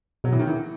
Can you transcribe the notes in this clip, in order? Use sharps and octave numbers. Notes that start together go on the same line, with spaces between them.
B2 F#3
E3
D#3
E3